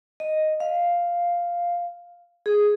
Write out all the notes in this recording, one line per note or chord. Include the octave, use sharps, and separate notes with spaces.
D#5
F5
G#4